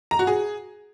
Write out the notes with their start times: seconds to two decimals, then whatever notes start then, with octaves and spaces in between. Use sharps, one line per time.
0.11 A#5
0.19 F#4
0.27 G#4